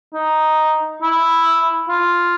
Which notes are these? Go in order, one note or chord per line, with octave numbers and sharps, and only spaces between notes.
D#4
E4
F4